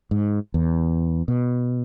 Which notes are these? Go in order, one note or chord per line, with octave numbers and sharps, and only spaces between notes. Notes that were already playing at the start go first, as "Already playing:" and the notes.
G#2
E2
B2